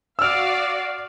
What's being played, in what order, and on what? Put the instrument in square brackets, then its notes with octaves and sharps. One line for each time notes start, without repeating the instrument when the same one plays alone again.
[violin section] F#4 D5 F5 [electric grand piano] E6 F6